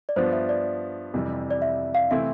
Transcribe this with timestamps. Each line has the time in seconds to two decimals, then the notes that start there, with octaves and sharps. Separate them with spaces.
0.09 D5
0.16 G2 F3 B3 D4 C5
0.33 E5
0.49 D5
1.14 F2 C3 E3 G3
1.51 D5
1.62 E5
1.95 F5
2.11 C3 E3 A3 C4 E4 E5